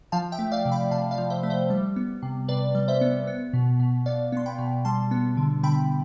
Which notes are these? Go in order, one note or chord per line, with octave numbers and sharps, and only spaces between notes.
F3 F5 A5
E5 G5
A3
D5 F5
C3
G5 B5
C3 F5 A5
D5 F5
F3
C5 E5
A3
C5 E5
G3
B3
C3
C3 B4 D5
G3
C5 E5
B3
B3
B2
B2
B3 D5 F5
B3 C6
G5 B5
B2
G3 A5 C6
B3
D3
D3 G5 B5